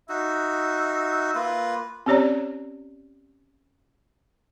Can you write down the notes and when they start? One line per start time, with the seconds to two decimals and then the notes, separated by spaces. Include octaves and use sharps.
0.09 D#4 F#4 E5
1.35 A#3 F4 B4
2.06 C4 C#4 G4 C#5 D5 A#5